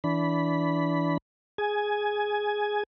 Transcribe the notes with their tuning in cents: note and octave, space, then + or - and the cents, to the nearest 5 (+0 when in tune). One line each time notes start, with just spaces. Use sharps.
E3 -5 D4 -25 B5 +0
G#4 +0 G#5 +15